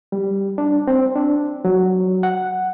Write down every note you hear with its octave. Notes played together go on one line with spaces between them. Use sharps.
G3
D4
C4
D4
F#3
F#5